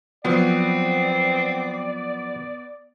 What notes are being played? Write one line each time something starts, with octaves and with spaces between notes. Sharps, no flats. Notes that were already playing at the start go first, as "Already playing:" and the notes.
F3 F#3 B3 C4 D5